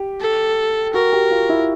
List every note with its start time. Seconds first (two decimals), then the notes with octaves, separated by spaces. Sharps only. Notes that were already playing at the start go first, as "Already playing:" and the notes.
Already playing: G4
0.21 A4
0.94 F#4 A#4
1.13 G4
1.31 F4
1.49 E4